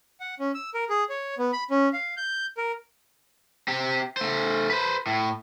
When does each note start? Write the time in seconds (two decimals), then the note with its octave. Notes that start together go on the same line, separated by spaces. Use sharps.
0.20 F#5
0.39 C#4
0.55 E6
0.74 A#4
0.89 G#4
1.10 C#5
1.38 B3
1.53 B5
1.70 C#4
1.93 F5
2.17 G6
2.57 A#4
3.68 C4 G4
4.17 A3 C5
4.70 B4 C5
5.06 A2